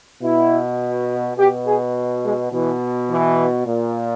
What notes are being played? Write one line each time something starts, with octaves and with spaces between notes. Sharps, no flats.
B2 E4
B2 G4
G#4
G#3
B2 E3
E3
A#2